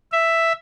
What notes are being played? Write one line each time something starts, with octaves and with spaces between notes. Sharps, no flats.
E5